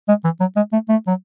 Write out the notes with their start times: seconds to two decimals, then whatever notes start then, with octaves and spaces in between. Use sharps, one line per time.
0.08 G#3
0.24 E3
0.40 F#3
0.56 G#3
0.73 A3
0.88 A3
1.07 F#3